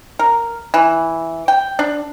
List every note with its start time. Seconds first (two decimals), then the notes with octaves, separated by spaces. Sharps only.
0.19 A#4
0.74 E3
1.48 G5
1.79 D4